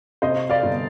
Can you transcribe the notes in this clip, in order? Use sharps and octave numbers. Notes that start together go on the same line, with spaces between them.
C3 C5 D#5
D5 F5
G1